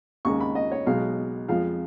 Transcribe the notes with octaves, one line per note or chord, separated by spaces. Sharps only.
D#2 C#3 G#3 C#6
B5
D#5
C#5
B1 B2 G#3 F5
F2 F3 G#3 F5